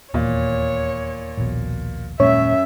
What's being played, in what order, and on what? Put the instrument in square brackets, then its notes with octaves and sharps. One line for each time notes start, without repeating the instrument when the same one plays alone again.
[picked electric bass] D#1 E2 [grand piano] A#2 [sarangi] C#5
[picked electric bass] D#1 A#1 B2
[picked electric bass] D#1 A#2 G#3 [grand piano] F#2 [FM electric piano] C#5 [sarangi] E5